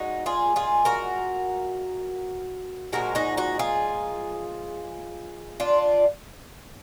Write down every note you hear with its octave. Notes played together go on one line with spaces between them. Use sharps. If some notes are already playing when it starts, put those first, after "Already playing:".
Already playing: A#2 G#3 D#4 F#4
F4 G#4
F4 G#4
F#4 A#4
A#2 F3 G#3 F#4 A#4
D#4 F#4
D#4 F#4
F4 G#4
D4 F4